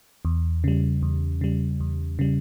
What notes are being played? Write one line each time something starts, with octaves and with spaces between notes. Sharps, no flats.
E2
C#3 G3
E2
C#3 G3
E2
C#3 G3